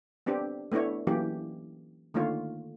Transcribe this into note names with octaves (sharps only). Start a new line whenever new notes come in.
B3 C4 D4 G4
A3 B3 D4 E4 C#5
E3 F#3 A#3 C#4 G4
D3 D#3 A3 A#3 F4 C#5